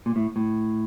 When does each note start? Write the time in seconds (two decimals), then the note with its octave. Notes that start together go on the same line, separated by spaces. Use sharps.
0.06 A#2
0.16 A2
0.36 A2